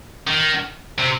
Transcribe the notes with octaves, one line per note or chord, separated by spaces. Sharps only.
D#3
C3